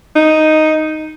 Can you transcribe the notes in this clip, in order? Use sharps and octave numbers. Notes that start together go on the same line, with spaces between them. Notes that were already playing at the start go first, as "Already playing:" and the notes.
D#4